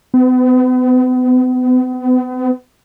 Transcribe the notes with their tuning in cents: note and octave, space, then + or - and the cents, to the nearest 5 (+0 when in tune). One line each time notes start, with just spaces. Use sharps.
B3 +40